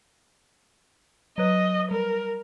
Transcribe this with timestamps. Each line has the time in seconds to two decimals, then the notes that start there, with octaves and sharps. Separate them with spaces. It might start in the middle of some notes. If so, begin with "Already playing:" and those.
1.38 F#3 B4 D#5
1.91 G3 A#4